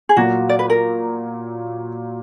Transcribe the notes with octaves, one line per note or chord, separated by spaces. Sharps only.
G#4
A#2 F#3 A#3 F#4
D5
B4
A#4